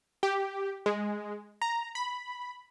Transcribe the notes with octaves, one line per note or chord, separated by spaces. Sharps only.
G4
G#3
A#5
B5